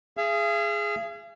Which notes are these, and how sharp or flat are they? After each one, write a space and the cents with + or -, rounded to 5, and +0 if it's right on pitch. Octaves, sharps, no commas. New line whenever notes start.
G#4 +0 F5 -45